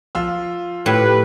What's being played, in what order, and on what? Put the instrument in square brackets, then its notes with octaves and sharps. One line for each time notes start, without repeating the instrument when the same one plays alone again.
[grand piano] F3 F4 E6
[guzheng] A2 [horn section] G4 B4